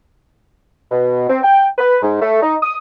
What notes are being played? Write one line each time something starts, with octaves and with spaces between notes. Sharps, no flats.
B2
C4
G5
B4
G#2
A3
D#4
D#6